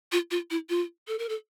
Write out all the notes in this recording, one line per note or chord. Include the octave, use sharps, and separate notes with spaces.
F4
F4
E4
F4
A4
A#4
A4